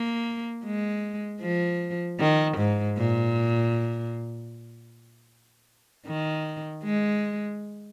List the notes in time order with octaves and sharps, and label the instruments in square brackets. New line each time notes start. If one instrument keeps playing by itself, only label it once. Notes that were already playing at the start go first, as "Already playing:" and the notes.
Already playing: [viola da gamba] A#3
G#3
F3
D#3
G#2
A#2
D#3
G#3